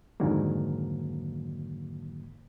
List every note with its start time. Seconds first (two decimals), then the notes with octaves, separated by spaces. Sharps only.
0.20 F2 G#2 D3 D#3 F#3 A#3